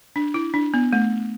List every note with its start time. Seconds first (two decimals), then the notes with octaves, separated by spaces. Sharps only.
0.16 D4
0.34 E4
0.54 D4
0.74 B3
0.93 A3